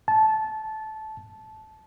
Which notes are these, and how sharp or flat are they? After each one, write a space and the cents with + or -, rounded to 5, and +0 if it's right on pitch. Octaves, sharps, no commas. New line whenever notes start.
A5 -15